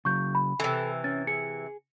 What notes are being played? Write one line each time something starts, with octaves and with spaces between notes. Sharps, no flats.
C#3 F#3 C#6 G6
B5
C3 E3 A4
C#4 A6
G#4 C#7